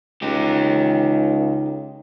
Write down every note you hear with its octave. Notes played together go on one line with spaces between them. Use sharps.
C#2 D#4 G4